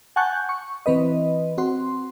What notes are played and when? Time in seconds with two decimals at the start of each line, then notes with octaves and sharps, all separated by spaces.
0.16 F#5 G#5 A5 C#6 F#6 G6
0.49 C#6
0.86 E3 C4 B4 D#5
1.58 C4 F#4 C6